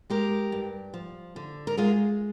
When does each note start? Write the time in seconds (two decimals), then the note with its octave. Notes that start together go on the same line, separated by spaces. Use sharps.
0.10 G#3 G4 A#4
0.52 G2
0.94 F3
1.36 D3
1.67 A#4
1.77 G#3 F4 G#4